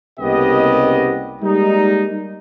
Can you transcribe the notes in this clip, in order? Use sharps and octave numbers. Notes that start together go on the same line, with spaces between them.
C2 C#3 A#3 B3 G4 D#5
G3 G#3 A#3 D#4